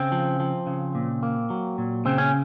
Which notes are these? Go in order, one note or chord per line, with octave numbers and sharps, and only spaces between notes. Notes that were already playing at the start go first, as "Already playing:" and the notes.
Already playing: C#3 C4
F3
F3
C#3
A#2
A#3
F#3
A#2
C#3 C4
C#4